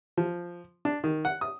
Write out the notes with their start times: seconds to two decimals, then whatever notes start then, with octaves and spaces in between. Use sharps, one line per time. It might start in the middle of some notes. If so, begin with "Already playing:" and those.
0.17 F3
0.85 D4
1.04 D#3
1.25 F#5
1.41 D#6